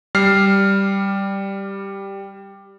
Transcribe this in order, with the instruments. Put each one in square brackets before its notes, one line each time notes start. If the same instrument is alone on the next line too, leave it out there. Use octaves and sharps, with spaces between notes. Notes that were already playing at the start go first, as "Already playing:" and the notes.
[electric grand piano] G3 F6 C7